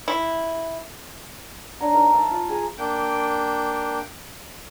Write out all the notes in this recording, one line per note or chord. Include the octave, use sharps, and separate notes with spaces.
E4
D4 C#5 F#5 A#5
D#4 A#4
E5 F5 A5
F4
G#4 A#5
A#3 D4 G5